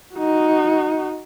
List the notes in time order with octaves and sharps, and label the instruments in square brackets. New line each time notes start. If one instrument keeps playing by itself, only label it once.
[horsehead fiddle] D#4 F#4